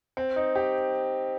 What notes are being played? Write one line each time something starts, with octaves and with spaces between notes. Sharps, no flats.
C4
D#4
G4